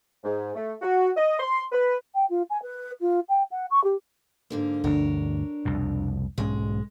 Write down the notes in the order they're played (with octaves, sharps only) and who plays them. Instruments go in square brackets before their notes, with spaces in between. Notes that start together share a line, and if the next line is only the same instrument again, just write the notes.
[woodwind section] G#2
A3
F#4
D#5
C6
B4
[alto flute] G5
F4
G#5
B4
F4
G5
F#5
C#6
G4
[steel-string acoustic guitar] G#2 D3 A#3
[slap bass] G1 D2 [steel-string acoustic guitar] D4 A#4 C#5
[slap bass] C2 F2 B2
[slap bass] B1 G#2 C#4 [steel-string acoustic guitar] G#3